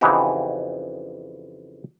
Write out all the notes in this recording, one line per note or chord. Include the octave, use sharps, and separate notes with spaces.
F2 C#3 E3 D#4 F#4 G4